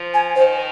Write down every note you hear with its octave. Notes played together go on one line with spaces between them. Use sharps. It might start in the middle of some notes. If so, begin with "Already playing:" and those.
Already playing: F3
G#5
D#3 C5